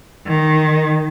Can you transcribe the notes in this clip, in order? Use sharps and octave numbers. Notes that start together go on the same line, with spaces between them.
D#3